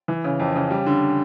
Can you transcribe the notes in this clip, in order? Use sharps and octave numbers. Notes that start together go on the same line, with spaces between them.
E3
C#3
F2
C#3
G3
D3